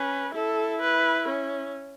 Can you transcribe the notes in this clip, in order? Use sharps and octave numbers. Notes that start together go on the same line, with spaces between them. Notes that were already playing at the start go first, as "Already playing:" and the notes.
Already playing: C#4 B4
E4 A4
B4
C#4